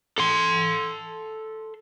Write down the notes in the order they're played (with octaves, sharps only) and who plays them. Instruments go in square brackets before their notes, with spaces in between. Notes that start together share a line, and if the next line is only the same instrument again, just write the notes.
[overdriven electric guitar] A4 C6